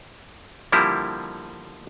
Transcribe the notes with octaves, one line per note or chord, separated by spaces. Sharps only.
D3 F3 G3 A#3 E4 G4